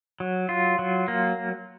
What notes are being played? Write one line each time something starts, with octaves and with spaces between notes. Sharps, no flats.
F#3
F4
F#3
A#3